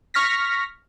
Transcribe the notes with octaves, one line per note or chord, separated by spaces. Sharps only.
C#6 F6 A#6 B6